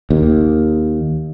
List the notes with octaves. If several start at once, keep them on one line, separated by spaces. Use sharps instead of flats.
D#2